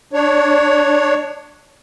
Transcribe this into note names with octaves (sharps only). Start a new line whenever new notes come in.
D4 C#5